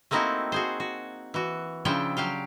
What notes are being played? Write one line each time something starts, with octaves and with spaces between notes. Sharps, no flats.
A3 A#3 C4 D#4 E4 F#4
F#4 G#4 C5
F#4
E3 F#4
C#3 F3 D4 E4 E5 G5
F#3 G4 F5 G5